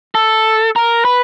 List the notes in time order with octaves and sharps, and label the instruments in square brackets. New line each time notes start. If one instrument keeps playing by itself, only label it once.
[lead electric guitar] A4
A#4
B4